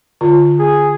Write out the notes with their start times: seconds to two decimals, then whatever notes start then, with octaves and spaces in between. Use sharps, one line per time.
0.21 D3 F4
0.59 G#4